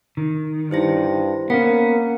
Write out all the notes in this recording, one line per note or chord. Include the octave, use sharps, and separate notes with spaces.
D#3
G2 E4 C5 A#6
A#3 B3 C#4 F#5